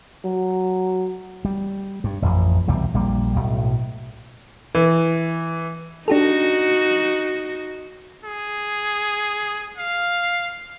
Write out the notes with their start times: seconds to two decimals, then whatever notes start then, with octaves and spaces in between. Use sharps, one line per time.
0.25 F#3
1.45 G3
2.04 G2
2.22 A1 F2
2.67 B1 E2 C3 G3
2.94 A#1 G3 A#3
3.36 B1 A2
4.75 E3
6.08 D4 D#4 F#4 G4 A4
8.25 G#4
9.78 F5